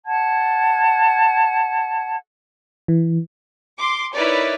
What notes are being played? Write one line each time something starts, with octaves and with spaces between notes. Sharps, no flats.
F#5 A5 G#6
E3
C6 D6
D#4 E4 A#4 B4 C#5 D5